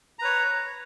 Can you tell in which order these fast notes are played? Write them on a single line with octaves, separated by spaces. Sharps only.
A#5 B4 C#5